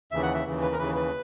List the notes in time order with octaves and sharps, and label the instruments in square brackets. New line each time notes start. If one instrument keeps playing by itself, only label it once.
[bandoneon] D#2 C#3 E3 E5
F#5
E5
D#2 C#3 E3
B4
A#4
D#2 C#3 E3 B4
B4